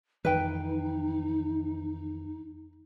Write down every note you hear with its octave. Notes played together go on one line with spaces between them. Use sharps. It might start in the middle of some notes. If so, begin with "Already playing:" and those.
F2 D#3 E3 D#4 B4 G5